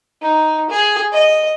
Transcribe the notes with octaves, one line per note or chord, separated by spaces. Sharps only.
D#4
G#4
D#5